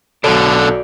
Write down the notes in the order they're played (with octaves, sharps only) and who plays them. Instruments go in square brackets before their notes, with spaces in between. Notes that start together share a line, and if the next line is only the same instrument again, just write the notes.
[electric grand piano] B1 A4 [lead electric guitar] B2 D3 [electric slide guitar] F#4 C#5 D5